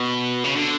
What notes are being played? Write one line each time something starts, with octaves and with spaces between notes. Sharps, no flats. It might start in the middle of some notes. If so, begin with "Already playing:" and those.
Already playing: B2
C#3
D3